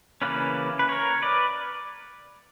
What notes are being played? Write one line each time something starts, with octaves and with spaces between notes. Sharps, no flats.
C#3 E3 A#3 C#4 B4 D5
B4
A#4 C#5
B4 D5